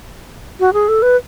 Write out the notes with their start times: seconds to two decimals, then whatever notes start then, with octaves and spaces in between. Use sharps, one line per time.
0.60 F#4
0.73 G#4
0.88 A4
1.02 B4